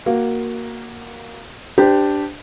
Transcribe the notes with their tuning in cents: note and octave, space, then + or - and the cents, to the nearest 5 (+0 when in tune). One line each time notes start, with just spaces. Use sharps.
A#3 +0 F#4 +0
D4 +0 G4 +0 C5 -35